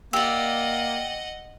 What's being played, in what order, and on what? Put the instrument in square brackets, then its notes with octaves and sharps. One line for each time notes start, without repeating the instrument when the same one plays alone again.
[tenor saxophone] A#3 [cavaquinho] G4 D5 [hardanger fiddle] D#5 F#5 [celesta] E6